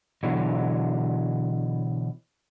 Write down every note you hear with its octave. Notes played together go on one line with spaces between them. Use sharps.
B2 D3 E3 F#3